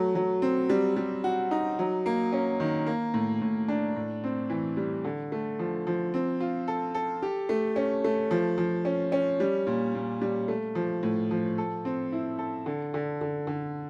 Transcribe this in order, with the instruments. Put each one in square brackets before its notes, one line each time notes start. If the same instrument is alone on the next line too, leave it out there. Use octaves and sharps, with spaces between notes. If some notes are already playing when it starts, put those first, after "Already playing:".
Already playing: [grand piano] F#3 A3
F#3
C4
G3
G3
F#4
D#4
F#3
A#3
C#4
D#3
A#3
A2
A2
D4
A2
C4
E3
G3
D3
A3
F3
F3
C4
F4
A4
A4
G4
A3
C#4
A3
F3
F3
C#4
C#4
G3
A#2
A#2
G3
A3
F3
A2
F3
A4
C4
E4
A4
D3
D3
D3
D3